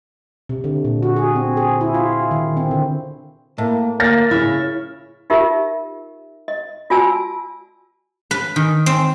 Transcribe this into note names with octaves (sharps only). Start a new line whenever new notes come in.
C3
D3
A#2
F#4
G#4
C4
G#4
E4
F4
D#3
C4
D3
A2 A#3
A#3 F6 A6 A#6
C#3 E4 C#5 F6
D#4 F4 G4 A#4 E5
D#5
F4 F#4 D5 G#5 A5 E6
B4
D#3
C4